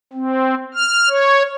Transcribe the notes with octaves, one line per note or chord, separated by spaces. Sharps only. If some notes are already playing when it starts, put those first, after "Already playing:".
C4
F6
C#5